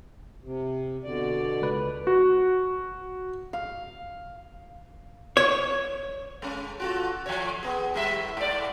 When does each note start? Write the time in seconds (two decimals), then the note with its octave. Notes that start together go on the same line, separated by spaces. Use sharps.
0.42 C3
1.04 B2 D3 D5
1.61 C#2 B4
2.07 F#4
3.53 F5
5.37 C#5
6.42 G#3 C#4
6.80 F4 F#4 A4
7.26 F3 A3 C#5
7.63 B3 G#4
7.94 A2 G3 E5
8.37 G#2 D5